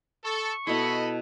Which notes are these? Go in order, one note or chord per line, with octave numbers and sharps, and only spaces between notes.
A4 C#6
B2 E4 A4 D#5 B5